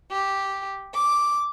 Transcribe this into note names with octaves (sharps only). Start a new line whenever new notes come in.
G4
D6